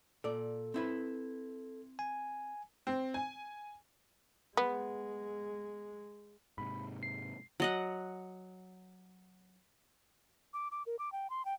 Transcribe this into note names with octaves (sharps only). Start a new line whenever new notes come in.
A#2 A4 D5
C4 E4 B4
G#5
C4
G#5
G#3 B3
G#2 C3 B5
C7
F#3 D#5 F#5
D6
D6
A#4
D6
G5
C6
G5